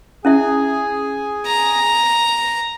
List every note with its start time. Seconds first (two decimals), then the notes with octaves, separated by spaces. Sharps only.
0.25 C#4 E4 G#4 E5 G#5
1.46 A#5